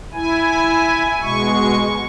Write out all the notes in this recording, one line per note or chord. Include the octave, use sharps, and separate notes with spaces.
E4 G#5
B2 G#3 C#6